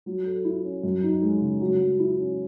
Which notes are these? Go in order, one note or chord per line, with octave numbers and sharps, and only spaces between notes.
F#3
A4
E4
C#4
F#2
D#4
G#3
C#3
F#3
F#3
E4
C#4